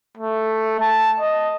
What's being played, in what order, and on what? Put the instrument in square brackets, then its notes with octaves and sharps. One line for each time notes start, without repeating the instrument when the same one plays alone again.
[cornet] A3
A5
D#5